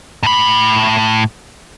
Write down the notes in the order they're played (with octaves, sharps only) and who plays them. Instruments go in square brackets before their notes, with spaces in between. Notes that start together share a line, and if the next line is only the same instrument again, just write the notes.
[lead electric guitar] A2 B5